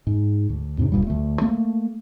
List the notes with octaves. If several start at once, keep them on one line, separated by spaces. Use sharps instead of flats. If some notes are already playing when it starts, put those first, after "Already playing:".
G#2
D2
F2 G#2 C3 D4
D1 G2 A#2 G3
D2 A3
A3 A#3